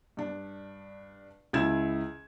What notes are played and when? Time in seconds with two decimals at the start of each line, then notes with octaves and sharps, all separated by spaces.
0.17 G2 D4
1.53 C#2 E4 G#6 E7